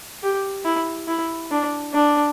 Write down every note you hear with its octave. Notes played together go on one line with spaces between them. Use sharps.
G4
E4
E4
D4
D4